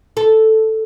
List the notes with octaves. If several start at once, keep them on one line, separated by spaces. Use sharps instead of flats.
A4